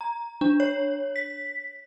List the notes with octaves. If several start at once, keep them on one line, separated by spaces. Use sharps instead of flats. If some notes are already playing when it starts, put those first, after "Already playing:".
A#5
D4
C#5
B6